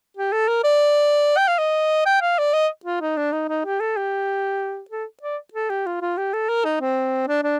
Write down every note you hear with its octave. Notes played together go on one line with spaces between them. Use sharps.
G4
A4
A#4
D5
G5
F5
D#5
G5
F5
D5
D#5
F4
D#4
D4
D#4
D#4
G4
A4
G4
A4
D5
A4
G4
F4
F4
G4
A4
A#4
D#4
C4
D4
D4